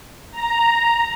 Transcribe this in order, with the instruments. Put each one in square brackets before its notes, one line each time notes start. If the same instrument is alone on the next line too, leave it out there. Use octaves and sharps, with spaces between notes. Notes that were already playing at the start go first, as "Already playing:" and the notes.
[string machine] A#5